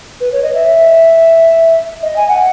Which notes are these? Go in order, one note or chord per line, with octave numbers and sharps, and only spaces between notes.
B4
C#5
D#5
E5
D#5
G#5
F#5